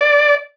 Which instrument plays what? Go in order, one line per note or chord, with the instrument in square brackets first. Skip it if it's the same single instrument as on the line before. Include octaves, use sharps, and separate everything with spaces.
[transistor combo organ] D5